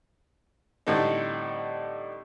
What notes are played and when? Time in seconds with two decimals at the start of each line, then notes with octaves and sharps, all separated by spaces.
0.87 A2 D3 G3 C4 D#4